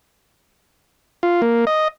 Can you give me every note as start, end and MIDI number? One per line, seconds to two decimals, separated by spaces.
1.23 1.41 65
1.42 1.65 58
1.67 1.88 75